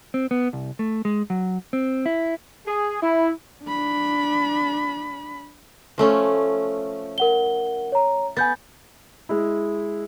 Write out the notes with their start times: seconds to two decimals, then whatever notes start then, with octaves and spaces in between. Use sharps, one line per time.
0.14 C4
0.31 B3
0.53 C2
0.79 A3
1.05 G#3
1.30 F#3
1.73 C4
2.06 E4
2.67 G#4
3.02 E4
3.64 D4 B5
5.98 F3 A3 C#4
7.18 A#4 F#5 G7
7.92 C#5 A#5
8.37 B3 G#5 G6 A6
9.29 G#3 E4